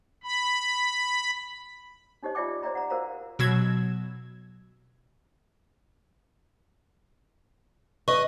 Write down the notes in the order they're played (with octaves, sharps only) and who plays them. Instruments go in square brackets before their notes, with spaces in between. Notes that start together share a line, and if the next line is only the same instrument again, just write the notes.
[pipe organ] B5
[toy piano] D4 D#4 G4 C5 D#5
F4 D5 E5 G5 D6
C5 D5 E5 G5 A#5 C6
F#5 A#5
F#4 A#4 C5 F5 A#5
[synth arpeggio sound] B2 F#3 E6 G#6
[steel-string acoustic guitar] B4 D#5 [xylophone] C#6